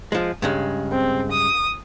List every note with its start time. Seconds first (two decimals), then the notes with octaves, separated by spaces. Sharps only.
0.12 F3 G#3
0.42 G2 C#3 G#3
0.91 C4
1.32 D#6